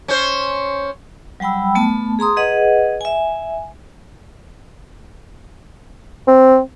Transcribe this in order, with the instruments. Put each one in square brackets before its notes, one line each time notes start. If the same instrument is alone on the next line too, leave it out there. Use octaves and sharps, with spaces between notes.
[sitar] C#4 C5
[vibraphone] F#3 G3 G5 B5 E6
A3 B3 A5
G#4 A#5 C6 D#6
G#4 B4 D#5 F#5
E5 G#5
[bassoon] C4